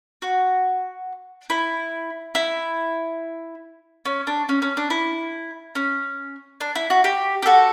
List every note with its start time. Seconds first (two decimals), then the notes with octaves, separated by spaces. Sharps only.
0.22 F#4
1.50 E4
2.35 E4
4.05 C#4
4.27 D4
4.49 C#4
4.62 C#4
4.77 D4
4.90 E4
5.75 C#4
6.61 D4
6.75 E4
6.90 F#4
7.04 G4
7.42 G4
7.46 F#4 A4